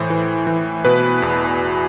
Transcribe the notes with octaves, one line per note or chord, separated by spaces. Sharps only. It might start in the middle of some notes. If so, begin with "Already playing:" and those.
Already playing: A2 E3 C5
E3
E3
B2 B4
E2